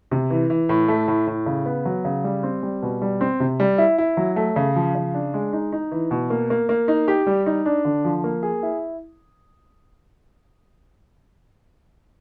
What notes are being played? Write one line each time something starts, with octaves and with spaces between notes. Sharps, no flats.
C3
E3
E3
A2
A3
A2
A2
C#3
B3
F#3
C#3
G3
C4
G3
B2
G3
C4
C3
G3
E4
E4
F#3
A3
C#3
F3
C#3
D4
G#3
D#4
D#4
E3
B2
A#3
A#3
A#3
D#4
G4
G3
D#4
D4
D3
F3
A#3
G#4
E4